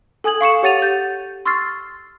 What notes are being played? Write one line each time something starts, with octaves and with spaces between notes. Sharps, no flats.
A4 G#5 D#6 G#6 F#7
F5 C#6 C#7 E7
G4 C#5 F#5 A6 D#7 F7
G6 A6
C6 C#6 E6 F6 A6 C7